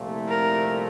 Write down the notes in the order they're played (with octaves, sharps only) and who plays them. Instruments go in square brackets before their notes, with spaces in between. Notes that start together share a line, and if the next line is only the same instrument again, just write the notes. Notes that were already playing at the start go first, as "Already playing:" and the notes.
Already playing: [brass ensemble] C2 A#2 F3 A3
[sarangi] A#4